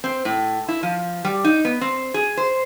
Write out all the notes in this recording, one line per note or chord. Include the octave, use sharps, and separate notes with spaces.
C4
A2
E4
F3
G3
D#4
B3
C4
G#4
C5